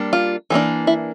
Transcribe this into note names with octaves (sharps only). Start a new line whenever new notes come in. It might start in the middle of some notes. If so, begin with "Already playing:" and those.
Already playing: G3 A#3 D4
F4
E3 G3 A#3 D4
E4